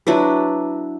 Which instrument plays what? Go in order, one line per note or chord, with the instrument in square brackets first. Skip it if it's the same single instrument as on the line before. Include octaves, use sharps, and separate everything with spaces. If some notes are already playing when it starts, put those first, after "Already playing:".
[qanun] F#3 D4 E4 B4